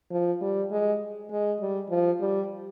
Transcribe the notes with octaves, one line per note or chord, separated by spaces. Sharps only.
F3
G3
G#3
G#3
G3
F3
G3